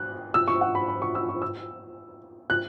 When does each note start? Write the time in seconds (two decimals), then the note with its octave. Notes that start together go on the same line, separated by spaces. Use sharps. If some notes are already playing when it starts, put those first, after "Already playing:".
Already playing: F#6
0.34 E6
0.48 C#6
0.61 F#5
0.75 B5
0.88 B5
1.02 C#6
1.15 E6
1.29 C#6
1.42 E6
2.50 F#6